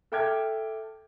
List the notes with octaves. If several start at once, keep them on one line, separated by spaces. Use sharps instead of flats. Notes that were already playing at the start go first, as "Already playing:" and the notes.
A4 E5 G5 D6 F6 G#6